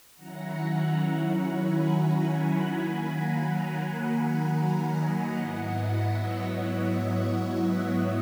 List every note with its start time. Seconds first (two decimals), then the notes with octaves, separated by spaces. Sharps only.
0.15 D#3 F#3 C#4 E4 F#5 A#5
0.81 F#5 A#5
1.13 F#5 A#5
1.47 G#5 B5
2.77 D#3 F#3 A#3 G#5 B5
3.10 F#5 A#5
3.42 G#5 B5
4.07 F#5 A#5
4.73 D#5 F#5
5.38 G#2 F#3 B3 E4
6.04 C#5 E5
7.33 C#5 E5